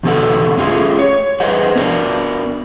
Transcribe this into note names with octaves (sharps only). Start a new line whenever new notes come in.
E2 B2 D3 A4 F#5
A3 C#4 F4 G#4
C#5
G#4 B4 C5 D#5 F#5
B3 D4 A#4